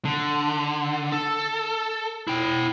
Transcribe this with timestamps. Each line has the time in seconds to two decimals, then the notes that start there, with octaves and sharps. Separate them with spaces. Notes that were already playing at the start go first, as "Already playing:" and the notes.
0.05 D3
1.12 A4
2.27 E4 G5